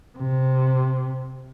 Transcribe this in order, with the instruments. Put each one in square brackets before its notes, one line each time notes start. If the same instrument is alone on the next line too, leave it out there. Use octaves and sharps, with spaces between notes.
[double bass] C3